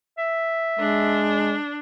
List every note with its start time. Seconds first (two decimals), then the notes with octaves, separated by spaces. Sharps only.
0.18 E5
0.79 G#3 D4